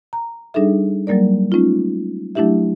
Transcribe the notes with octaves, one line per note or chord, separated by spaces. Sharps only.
A#5
G3 D4 D#4 G#4 A4 E5
F#3 G3 A#3 A#4 D5
A3 C#4 D#4 F4
F#3 A3 D4 E4 G4 E5